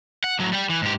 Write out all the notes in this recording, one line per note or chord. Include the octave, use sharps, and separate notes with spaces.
F#5
A2 F#3
G3 G5
E3
G#2 G4